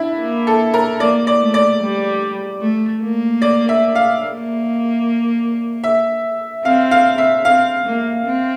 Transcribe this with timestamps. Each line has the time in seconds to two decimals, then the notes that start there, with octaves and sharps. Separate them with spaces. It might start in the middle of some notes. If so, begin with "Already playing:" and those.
Already playing: D4 E4
0.19 A#3
0.47 A4
0.74 A#4
1.00 A#3 D5
1.27 D5
1.41 A3
1.54 D5
1.81 G3
2.61 A3
3.02 A#3
3.42 D5
3.69 E5
3.95 F5
4.23 A#3
5.84 E5
6.65 C4 F5
6.91 F5
7.18 E5
7.45 C4 F5
7.86 A#3
8.25 C4